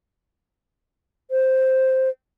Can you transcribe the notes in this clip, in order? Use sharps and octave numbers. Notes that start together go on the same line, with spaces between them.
C5